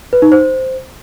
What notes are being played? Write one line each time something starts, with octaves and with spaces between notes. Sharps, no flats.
B4
D#4
C5